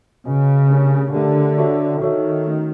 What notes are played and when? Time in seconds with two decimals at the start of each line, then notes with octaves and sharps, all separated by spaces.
0.25 C#3 F#4 B4 D#5 G#5
0.70 A3 D4 G4 A#4 C#5
1.14 D3 A3 D4 G4 A#4 C#5
1.58 F#4 A4 C#5 E5
2.01 D#3 F#4 A4 C#5 E5
2.46 A3 C#4 F#4